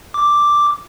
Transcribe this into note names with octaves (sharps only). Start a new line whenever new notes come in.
D6